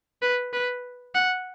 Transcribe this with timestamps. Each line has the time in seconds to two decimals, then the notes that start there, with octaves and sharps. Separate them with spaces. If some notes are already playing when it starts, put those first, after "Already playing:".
0.22 B4
0.53 B4
1.15 F#5